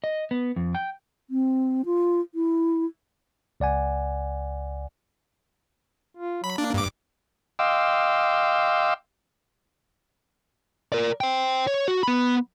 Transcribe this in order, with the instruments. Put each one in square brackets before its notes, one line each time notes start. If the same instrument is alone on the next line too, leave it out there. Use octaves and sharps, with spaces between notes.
[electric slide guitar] D#5
B3
F2
G5
[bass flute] C4
F4
E4
[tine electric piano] C#2 D5 F#5 G#5
[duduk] F4
[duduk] F#3 [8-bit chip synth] B5
[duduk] A#3 [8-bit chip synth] D4
[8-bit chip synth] G2 D6
[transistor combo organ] D#5 F5 G5 C6 D6 E6
[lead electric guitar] A#4 D5
C5 G5
C#5
F#4
B3 B5